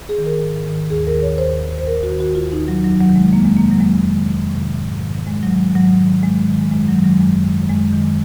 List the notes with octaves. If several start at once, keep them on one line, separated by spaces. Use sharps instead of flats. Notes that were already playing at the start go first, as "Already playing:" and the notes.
G#4
D#3
A#4
G#2
D#3
D#2 G#4
A#4
D#3
C#5
D#2 C5
D#3
C5
D#2 A#4
F#4
D#3
F#4
D#2 F4
D#4
D#3
F#3
F2 F#3
F#3
C3 D#3
G#3
F2 A#3
G#3
C3 D#3 A#3
F#3
F2 G#3
C3 D#3
F2
C3 D#3
G#2
D#3
G#2 G#3
F#3
D#3
G#2 F#3
D#3
G#2 G#3
D#3
F#2 G#3
F#3
D#3
F#3
F#2 G#3
D#3
F#2 G#3
D#3